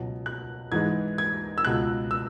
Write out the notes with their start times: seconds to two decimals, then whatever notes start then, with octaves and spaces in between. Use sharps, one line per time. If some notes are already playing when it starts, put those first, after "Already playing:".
Already playing: C#2 B2 F#3
0.26 F#6
0.72 G#2 E3 G#3 G#6
1.18 G#6
1.58 E6
1.65 C#2 B2 G#3 F#6
2.11 E6